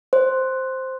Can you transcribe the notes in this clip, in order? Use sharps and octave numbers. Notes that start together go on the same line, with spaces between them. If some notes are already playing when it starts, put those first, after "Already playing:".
C5